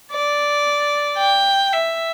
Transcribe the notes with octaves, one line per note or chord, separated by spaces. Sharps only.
D5
G5
E5